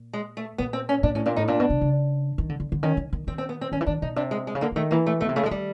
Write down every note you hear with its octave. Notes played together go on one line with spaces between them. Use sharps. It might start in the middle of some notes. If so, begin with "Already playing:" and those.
Already playing: A#2
G#3
A3
A#2 B3
C4
C#4
A#2 D4
A2 C#4
A#2 D4
A2 D#4
A#2 D4
B2
C3
C#3
D#3
D3
D3
D3
D#3 C#4
D#3
D#3
D#3 C4
C4
B3
C4
D#3 C#4
E3
D#3 D4
B2 D#4
C3 D4
G#3
G#3
C#3
D3 A#3
D3
D#3 A3
E3 A#3
A3
B2 A3
C3
C#3 A3
D3
G#3
D#3 G3